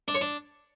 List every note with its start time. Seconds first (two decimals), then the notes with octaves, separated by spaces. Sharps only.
0.08 D4
0.15 C#5
0.21 D4